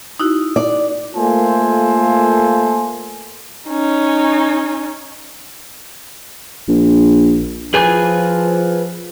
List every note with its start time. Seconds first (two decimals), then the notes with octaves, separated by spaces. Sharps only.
0.20 D#4 E4 F#4
0.56 D5
1.15 A3 A#3 F4 A4 C5 G#5
3.69 C#4 D#4
6.68 A#1
7.74 F3 G#4 B4 G#5